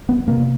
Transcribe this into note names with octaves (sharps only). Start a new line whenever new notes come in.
B3
C3 A#3